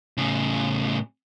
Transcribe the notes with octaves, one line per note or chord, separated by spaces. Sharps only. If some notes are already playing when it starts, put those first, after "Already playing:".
A2 C#3